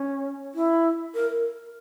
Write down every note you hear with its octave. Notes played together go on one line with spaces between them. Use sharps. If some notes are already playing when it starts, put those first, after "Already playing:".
Already playing: C#4
E4
A#4